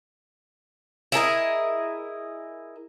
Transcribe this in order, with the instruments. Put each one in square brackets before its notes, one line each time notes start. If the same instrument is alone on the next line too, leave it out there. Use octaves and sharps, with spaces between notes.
[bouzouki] E4 G#4 A#4 D#5